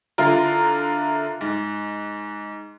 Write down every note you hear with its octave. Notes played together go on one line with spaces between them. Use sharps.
D3 E4 F4 A#4
G#2